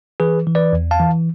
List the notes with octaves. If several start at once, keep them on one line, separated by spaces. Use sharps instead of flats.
E3 G#4 B4
E3
B4 D5
E2
F5 A5
E3